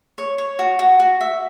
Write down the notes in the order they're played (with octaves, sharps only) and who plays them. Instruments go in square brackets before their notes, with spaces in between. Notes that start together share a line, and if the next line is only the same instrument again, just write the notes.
[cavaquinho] C#5
C#5
F#4
F#4
F#4
E5